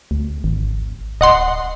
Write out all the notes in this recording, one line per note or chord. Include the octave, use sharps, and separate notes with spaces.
D2
G#1
D1 D#5 F#5 C6